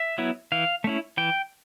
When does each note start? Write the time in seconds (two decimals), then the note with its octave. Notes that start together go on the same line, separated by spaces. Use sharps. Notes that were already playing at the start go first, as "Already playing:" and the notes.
Already playing: E5
0.18 F#3 B3 E4
0.52 E3 F5
0.84 A3 C#4 E4
1.17 E3 G5